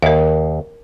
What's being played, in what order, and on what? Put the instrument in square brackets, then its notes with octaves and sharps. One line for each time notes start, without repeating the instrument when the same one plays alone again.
[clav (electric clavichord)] D#2 [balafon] A#4 E5